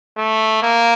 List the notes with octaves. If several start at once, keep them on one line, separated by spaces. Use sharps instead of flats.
A3
A#3